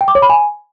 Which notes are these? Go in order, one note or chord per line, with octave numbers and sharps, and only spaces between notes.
G5
D6
C#5
B5
G#5